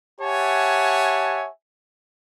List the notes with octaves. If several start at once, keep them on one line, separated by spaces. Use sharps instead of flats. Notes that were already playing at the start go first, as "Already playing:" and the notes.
G4 C#5 E5 F#5 G#5 A5